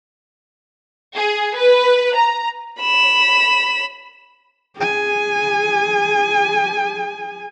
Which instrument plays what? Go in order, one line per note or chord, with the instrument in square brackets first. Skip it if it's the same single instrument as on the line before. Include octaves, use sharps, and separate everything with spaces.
[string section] G#4
B4
A#5
[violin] B5 E7
[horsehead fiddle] G#4 G#5